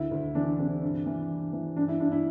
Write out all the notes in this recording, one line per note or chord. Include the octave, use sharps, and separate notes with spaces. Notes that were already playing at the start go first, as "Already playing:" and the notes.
Already playing: D2 E4
D2
E3 D4
C3 D4
G2
E3
G2
E3
G2 D4
E4
G2 D4
E4